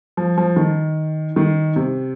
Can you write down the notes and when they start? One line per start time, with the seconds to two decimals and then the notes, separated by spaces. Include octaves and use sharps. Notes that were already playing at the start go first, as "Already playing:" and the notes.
0.17 F3
0.38 F3
0.56 D#3
1.36 D#3
1.76 C3